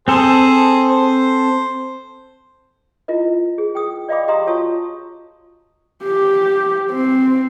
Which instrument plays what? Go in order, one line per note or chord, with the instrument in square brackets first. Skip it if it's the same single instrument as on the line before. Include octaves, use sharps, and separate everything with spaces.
[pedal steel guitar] C4 A4 [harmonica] G#4 C5
[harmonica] C5
[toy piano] E4 F4 A#4 D#5
G#4
G5 D#6
D5 D#5 F5 G5 B5 D6
G4 D#5 F5 A#5 C6 D#6
F4 F#4 C#5 A5 C#6 D#6
[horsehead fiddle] G4
C4